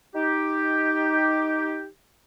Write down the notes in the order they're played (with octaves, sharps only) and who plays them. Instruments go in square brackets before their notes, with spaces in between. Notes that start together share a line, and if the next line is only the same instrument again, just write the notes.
[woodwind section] D#4 G4